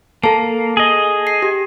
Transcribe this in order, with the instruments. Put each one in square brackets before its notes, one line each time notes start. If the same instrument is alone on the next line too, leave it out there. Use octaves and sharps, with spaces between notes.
[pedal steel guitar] A#3 [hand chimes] A4 A5
[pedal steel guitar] G#4 D#5
[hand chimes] C7
G4